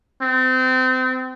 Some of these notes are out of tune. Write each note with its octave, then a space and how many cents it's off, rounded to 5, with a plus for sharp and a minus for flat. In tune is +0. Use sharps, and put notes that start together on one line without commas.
C4 -30